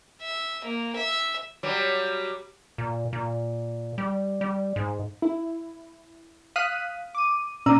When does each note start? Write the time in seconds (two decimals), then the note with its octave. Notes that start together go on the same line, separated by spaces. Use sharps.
0.22 E5
0.64 A#3
0.96 E5
1.63 F#3 G3
2.78 A#2
3.13 A#2
3.98 G3
4.41 G3
4.76 G#2
5.22 E4
6.56 F5 D#6 F6 F#6 B6 D#7
7.15 D6 D#7
7.66 A#2 C#4 D5 A#5 E6 D#7